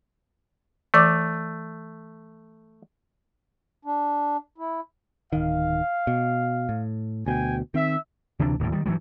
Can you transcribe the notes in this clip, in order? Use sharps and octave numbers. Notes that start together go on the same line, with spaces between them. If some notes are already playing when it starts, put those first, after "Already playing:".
E3 A3 D5 D6
D4
E4
D1 D#3 F5
B2
A2
D2 B2 G5 G#5
D#3 C4 E5
D2 C3 E3 D4
D1 D#2 A2 D#3
D#3 G3
G2 E3 F#3 G3